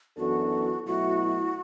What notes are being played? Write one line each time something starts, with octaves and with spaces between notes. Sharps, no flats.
F#2 E3 B3 D4 F#4 A4
B2 F#3 A3 E4 F#4